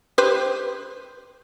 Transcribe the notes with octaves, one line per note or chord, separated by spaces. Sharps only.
G4 B4 C5